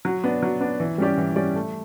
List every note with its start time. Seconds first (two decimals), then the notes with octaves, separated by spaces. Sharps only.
0.05 F#3
0.24 B3 D4
0.43 F#3
0.61 B3 D4
0.80 E3
0.98 G3 C#4 G4 D5
1.17 E3
1.36 G3 C#4 G4 D5
1.55 A3